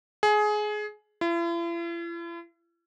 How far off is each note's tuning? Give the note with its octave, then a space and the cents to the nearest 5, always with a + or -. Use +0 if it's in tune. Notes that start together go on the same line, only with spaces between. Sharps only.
G#4 +20
E4 +45